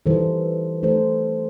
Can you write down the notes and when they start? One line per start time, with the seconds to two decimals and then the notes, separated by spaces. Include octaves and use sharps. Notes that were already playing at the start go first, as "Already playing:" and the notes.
0.06 E3 G3 D#4 A4 C5
0.83 E3 A3 D#4 A4 C5